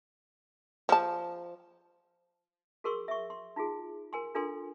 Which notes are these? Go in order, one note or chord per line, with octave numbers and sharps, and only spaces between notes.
F3 A5
F#4 G#4 A#4 C6 C#6 E6
E5 C#6
C6
D#4 F4 F#4 G#4
A#4 G#5 C6
D4 F4 A4 A#4 G#5 C6